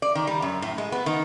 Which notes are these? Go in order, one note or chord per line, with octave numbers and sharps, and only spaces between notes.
D5
D#3
G3
F#2
A2
G#3
B3
D#3